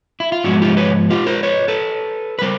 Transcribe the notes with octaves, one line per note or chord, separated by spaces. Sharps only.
E4
F4
G#2 F3 G#3 B3 E4 F#4
F4 G4
B4 C#5
F4 G4
A#4 C5
B4 C#5
A4 B4
B4
G3 A#4 C5